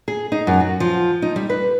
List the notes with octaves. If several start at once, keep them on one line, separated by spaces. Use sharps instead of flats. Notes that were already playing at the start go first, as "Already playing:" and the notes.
G#4
D#4
F#2
F#4
F3
D#4
G3
B4